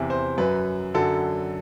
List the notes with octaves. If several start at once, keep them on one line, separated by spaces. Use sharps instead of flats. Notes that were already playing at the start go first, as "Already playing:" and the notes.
Already playing: E2 C3 E3 E5
C5
F#2 F#3 B4
F#2 D3 F#3 A4